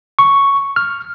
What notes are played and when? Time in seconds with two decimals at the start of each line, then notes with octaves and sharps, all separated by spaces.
0.19 C#6
0.76 F6